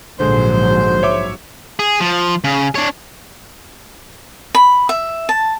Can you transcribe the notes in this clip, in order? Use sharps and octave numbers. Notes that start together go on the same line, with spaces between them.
A#1 G#2 D3 F#3 G#3 C5
C#5 E5 D6
G#4
F3
C#3
D4 C#5
B5
E5
A5